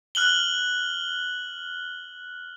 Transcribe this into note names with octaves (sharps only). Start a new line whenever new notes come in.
F6 F#6 F#7 G7